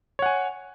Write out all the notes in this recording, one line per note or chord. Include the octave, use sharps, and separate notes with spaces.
C#5 F#5 G#5